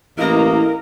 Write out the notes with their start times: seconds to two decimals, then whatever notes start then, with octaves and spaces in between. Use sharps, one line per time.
0.19 A1 A#3 E4 A#4 D#5 A#5